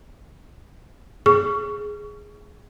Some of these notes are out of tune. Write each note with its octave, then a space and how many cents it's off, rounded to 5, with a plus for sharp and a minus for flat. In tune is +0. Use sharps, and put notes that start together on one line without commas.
G#4 +0 C#6 +25